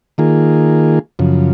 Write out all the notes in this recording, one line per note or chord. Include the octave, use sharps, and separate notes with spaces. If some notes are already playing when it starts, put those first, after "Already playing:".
D#3 A#3 F4 G#4
F#2 C#3 F3